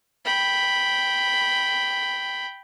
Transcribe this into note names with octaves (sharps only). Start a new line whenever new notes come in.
G5 B5